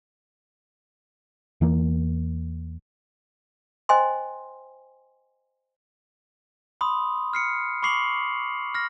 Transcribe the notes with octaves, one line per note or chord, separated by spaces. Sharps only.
E2 E3 A#3
C5 D#5 G5 G#5 C6
B5 C6 D#6
F6 C7 C#7
B5 C#6 D6 C7 F7 F#7
F6 A#6